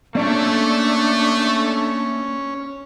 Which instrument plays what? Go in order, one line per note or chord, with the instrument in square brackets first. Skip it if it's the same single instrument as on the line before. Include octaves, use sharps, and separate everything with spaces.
[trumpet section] A3 [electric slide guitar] A#3 D5 [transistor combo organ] C#4 [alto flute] D4